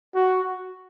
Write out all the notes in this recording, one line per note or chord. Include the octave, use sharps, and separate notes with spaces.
F#4